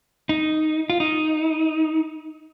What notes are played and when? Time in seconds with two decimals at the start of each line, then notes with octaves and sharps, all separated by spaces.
0.29 D#4
0.90 F4
1.00 D#4